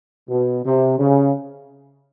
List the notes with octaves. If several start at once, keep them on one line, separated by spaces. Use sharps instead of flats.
B2
C3
C#3